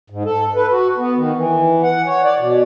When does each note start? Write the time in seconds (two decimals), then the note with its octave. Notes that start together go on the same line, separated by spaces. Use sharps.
0.10 G#2
0.25 A4
0.55 B4
0.71 F#4
0.98 B3
1.17 D#3
1.35 E3
1.83 F#5
2.06 C#5
2.24 D5
2.39 B2